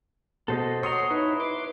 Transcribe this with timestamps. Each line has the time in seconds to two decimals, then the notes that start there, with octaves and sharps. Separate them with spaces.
0.48 B2 A4 C5 D#5
0.83 C#5 F#5 A#5 C6 D#6
1.10 D#4 E4 B4 C#5
1.40 B4 C6 D6